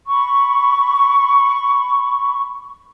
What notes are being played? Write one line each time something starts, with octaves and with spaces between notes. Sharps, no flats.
B5 C#6